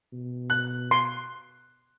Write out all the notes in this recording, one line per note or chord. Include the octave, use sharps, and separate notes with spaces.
B2
F#6
C6